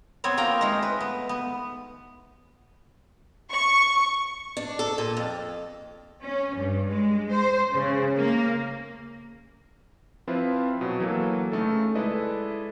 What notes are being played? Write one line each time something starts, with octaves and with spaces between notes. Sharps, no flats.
B3 C4 C5 C#5
A#3 F4 G5 A#5
G#3 A3 D#4 C5
B4
B3
B3
C#6
D4
A4
A#2
F2
C#4
G2
G#3
C5
C#3
A#3
F3 C4 E4 F4 B4
B2 F#3
E3 F#3 A#3 A4
C#3 A3 D#4 A4
G#3 E4 A4 B4 D5 D#5